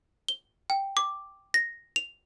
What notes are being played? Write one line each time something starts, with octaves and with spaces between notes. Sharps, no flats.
G7
G5
D6
A#6
F7